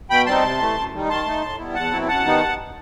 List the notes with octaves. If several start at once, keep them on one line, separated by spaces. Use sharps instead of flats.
B2 G5 B5
G3 C4 D#4 A5 C6
C3
E3 A3
F#2
D#3 G3 D#4
D#3 A5 C6
A3 D#4
A2
G3 B3 E4
E2 F#5 A5
B2 F#3 C4 E4
F#2 F#5 A5
D#3 G3 B3 D#4